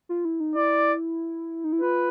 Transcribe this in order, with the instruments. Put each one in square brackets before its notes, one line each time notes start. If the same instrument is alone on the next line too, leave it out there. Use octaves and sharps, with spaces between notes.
[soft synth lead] F4
E4
D#4
[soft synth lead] E4 [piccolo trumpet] D5
[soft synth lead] D#4
E4
[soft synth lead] F4 [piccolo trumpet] B4